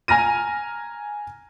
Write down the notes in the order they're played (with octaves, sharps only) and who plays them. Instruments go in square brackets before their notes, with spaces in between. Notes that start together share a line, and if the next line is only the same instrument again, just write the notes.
[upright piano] G#5 A#5 F6 A#6 D#7